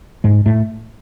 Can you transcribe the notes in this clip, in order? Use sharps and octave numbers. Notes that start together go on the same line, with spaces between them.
G#2 G#3
A2 A3